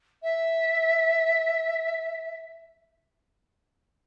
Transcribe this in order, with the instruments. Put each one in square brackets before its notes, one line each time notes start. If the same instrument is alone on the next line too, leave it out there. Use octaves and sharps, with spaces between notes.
[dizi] E5